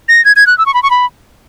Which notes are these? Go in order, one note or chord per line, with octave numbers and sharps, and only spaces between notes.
A#6
G#6
G#6
F#6
E6
C#6
B5
C#6
B5